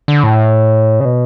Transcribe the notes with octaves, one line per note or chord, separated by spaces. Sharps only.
D3
A2
C#3
B2